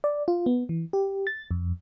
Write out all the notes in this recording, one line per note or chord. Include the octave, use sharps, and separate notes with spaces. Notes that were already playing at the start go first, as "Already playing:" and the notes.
D5
F4
B3
E3
G4
A6
F2